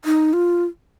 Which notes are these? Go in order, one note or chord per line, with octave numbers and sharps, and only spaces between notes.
D#4
F4